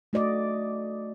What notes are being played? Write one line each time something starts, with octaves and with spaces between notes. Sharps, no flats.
A3 F#4 D5 D#5